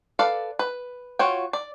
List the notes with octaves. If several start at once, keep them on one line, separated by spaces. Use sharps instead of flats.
A4 B4 D5 F5
B4
F4 F#4 C#5 G5
D5